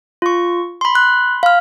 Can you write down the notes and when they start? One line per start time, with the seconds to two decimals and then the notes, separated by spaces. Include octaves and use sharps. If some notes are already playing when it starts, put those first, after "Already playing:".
0.22 F4 C#6
0.81 B5 C6
0.95 F#6
1.43 F5 F6